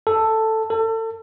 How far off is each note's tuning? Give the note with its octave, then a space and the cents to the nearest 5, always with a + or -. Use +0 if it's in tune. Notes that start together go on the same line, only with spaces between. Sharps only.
A4 +5
A4 +30